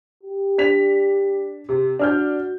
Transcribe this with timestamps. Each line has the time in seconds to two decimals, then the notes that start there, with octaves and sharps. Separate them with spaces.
0.23 G4
0.58 D4 B6 F7
1.69 C3
1.99 D4 F#4 F6 G6